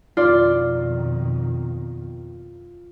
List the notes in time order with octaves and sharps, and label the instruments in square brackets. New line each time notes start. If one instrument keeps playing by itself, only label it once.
[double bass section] F2 B2 D#3 [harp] F4 D5